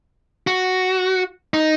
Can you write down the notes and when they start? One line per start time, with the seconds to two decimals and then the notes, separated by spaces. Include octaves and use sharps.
0.47 F#4
1.54 D#4